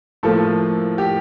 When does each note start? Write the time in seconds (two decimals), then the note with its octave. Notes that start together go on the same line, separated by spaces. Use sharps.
0.23 A2 F3 A#3 A4
0.98 G4